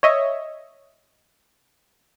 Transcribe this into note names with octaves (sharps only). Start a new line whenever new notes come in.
C#5 D#5 E5